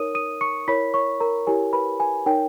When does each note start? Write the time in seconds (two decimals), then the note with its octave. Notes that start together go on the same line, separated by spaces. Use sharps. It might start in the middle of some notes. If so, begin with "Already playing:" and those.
Already playing: D#4 A#4 C#5 D#6 D#7
0.15 D#6 D#7
0.41 C#6 C#7
0.68 E4 A#4 C#5 B5 B6
0.94 C#5 C#6
1.20 A#4 A#5
1.47 E4 G4 A#4 C#5 G#5
1.73 B4 B5
2.00 G#5
2.26 D#4 A#4 C#5 G5